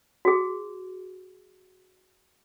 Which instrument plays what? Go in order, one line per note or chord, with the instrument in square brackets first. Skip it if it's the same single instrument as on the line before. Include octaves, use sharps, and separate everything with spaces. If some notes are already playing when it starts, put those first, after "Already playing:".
[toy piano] F#4 G#4